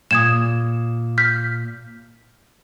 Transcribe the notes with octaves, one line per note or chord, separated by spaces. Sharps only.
A#2 D#6 G#6 E7
F6 G6 B6